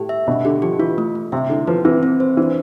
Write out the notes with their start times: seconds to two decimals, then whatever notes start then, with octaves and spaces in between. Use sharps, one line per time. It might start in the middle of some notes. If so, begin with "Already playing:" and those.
Already playing: A2 G4
0.09 E5
0.27 B2 D4
0.45 D3 G4
0.62 F3 G4
0.79 E3 F4
0.98 A3
1.15 A3
1.32 C3 E5
1.49 D3 E4
1.67 F3 B4
1.85 E3 C4
2.03 C4
2.20 C5
2.37 E3 D4